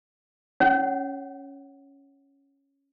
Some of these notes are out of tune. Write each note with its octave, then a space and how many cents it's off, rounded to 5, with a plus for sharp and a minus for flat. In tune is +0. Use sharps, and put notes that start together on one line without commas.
C#4 +0 C#5 +0 F#5 +10